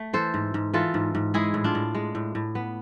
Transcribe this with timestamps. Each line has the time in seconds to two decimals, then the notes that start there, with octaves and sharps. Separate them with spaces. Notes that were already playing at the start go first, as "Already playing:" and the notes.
Already playing: A3
0.13 E3 A4 C5
0.34 G#2
0.54 G#2
0.74 E3 F4 A4
0.94 G#2
1.15 G#2
1.34 G#3 E4 G#4
1.54 A2
1.64 D4 F4
1.75 A2
1.95 G#3
2.15 A2
2.35 A2
2.55 B3